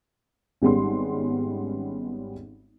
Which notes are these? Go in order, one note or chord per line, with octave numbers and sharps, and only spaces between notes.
G#1 G3 G#3 B3 C#4 C6